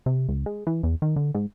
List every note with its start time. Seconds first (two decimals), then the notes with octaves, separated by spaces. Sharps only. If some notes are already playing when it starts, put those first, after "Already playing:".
0.06 C3
0.29 C#2
0.46 G#3
0.67 E3
0.83 E2
1.02 D#3
1.16 D3
1.35 G#2